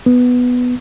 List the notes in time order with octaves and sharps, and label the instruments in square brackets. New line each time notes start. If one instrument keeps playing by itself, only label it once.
[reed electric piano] B3